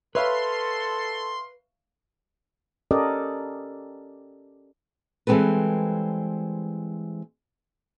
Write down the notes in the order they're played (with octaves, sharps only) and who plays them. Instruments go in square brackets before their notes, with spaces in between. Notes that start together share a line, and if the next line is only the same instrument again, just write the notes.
[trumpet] A4 [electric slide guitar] B4 [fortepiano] C#5 E5 F5 [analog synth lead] C6
[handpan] C#4 G4 A4 A#4 D5 D#5
[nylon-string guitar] E3 G3 G#3 C4 A4 B4